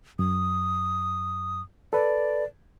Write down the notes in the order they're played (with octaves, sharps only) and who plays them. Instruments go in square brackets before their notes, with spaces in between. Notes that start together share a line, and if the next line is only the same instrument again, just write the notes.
[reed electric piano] F#2 [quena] D#6
[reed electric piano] A4 B4 [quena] D5